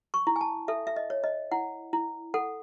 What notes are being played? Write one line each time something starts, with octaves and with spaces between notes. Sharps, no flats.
C#6
E4
G#5
A5
A4 E5
E5
D#5
C#5
D#5
E4 F#5
E4
A4 F#5